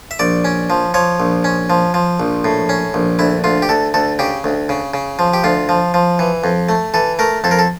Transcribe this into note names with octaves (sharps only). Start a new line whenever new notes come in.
E5
A#1 D5
C#4
F3
F3 C#5
A#1
C#4
F3
F3
A#1
A2
C#4
A#1
D2 E4
D2 F4
G4
D2 A4
D2 A4
C#3 G4
D2
C#3
C#3
F3
G4
D2 F4
F3
F3
E3
F2
A3
E3 A4
A3 A#4
F2 A4
A#4
A4